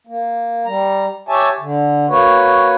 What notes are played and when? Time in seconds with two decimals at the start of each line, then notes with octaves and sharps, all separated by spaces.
0.07 A#3
0.65 G3 A#5
1.29 G4 C#5 E5 G#5 A5
1.60 D3
2.09 A#3 F#4 B4 C#5